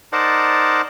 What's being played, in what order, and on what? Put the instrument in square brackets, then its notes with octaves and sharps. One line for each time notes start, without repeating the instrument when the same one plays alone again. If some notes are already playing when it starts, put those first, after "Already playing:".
[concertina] D#4 A#4 C5 D5 F#5 A5